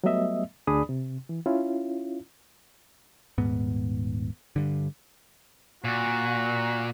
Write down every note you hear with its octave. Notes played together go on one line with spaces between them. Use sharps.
F#3 G3 A3 B3 D#5 E5
D2 D4 G#4 D5 B5 D#6
C3
E3
C#4 E4 F4
D#1 G#2 B3
G2 D3
A#2 F#4